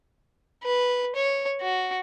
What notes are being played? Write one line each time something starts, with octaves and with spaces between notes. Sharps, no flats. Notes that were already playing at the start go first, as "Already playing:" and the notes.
B4
C#5
F#4